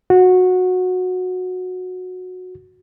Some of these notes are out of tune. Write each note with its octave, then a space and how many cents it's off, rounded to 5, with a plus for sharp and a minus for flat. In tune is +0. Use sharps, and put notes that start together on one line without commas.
F#4 -15